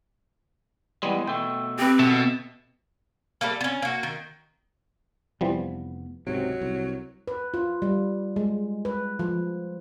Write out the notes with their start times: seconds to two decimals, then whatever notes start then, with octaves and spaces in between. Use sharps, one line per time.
1.03 E3 G3 G#3 B3
1.28 B2 A3 G5
1.79 C4 G4 B4
1.99 B2 A4 E5
3.41 G3 A3 A#3
3.61 B3 C#4
3.82 A#3 F#4
4.03 D#3
5.41 F1 E3 F3 G3 B3
6.27 C#2 G#2 C3 F#3
6.61 C2
7.28 B4
7.54 F4
7.82 G3
8.36 G#3
8.85 B4
9.19 F3